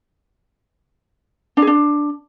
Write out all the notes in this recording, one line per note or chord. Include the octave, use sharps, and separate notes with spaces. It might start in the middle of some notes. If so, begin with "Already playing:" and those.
D4
G#4
D4